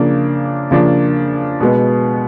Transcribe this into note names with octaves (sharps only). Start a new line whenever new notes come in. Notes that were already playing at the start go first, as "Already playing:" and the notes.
Already playing: C#3 F3 A#3 D4
C#3 F3 A#3 D4
B2 G#3 B3